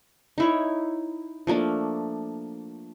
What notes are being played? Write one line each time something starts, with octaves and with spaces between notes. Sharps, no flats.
D#4 E4 C#5
F3 A3 A#3 D4